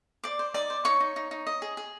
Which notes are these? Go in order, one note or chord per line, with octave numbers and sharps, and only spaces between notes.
C5 D5 D6
C5
D#4 D5 D6
C5
D#4 C#5 C#6
D#4
D#4
D#4
D#5
G#4
G#4